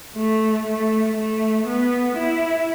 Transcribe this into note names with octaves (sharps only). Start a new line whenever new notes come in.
A3
A3
A3
B3
E4